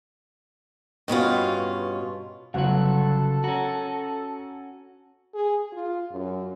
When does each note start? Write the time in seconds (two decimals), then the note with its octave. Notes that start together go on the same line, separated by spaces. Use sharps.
1.08 G2 B2 C#4 F4
2.54 G1 C#3 F#3 F#4 A4 F#5
3.44 C#4 F#4 A#5
5.34 G#4
5.73 F4
6.12 F#2